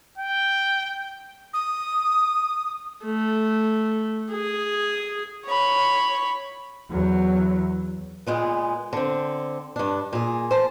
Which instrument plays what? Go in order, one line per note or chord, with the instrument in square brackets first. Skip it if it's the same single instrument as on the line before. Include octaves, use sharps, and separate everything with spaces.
[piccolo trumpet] G5
[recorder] D#6
[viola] A3
G#4
[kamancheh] C#5 B5
[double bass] E2 F#3
[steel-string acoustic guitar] A#2 G#3 B3
D3 C4
G2 D4
A#2 G#4
C5 A5